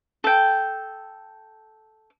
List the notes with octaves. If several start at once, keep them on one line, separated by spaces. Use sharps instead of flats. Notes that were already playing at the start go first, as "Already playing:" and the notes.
A4 G5